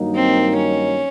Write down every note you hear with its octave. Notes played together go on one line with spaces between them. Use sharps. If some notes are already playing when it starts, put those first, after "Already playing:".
Already playing: G2 D#3 F#3 A#3 D#4
C4
C#4